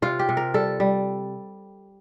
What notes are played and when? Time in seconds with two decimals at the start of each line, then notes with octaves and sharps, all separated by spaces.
0.02 C3 F4
0.19 G4
0.29 C3
0.37 A#4
0.54 G3 A4
0.80 G3